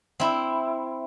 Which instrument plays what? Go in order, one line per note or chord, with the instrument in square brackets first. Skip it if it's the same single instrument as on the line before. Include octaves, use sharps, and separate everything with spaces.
[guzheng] C4 E4